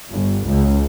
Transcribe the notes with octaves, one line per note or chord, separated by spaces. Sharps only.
G1
C#2